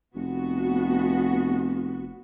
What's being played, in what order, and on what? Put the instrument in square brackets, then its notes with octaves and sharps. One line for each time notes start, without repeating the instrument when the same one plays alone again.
[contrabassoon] F1 [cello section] B3 F#4